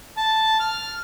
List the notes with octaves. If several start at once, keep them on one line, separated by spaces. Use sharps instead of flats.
A5
F6